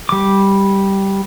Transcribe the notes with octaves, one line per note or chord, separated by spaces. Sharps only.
G3 D6